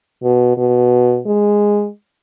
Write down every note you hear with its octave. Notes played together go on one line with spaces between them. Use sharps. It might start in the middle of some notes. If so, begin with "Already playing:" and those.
B2
B2
G#3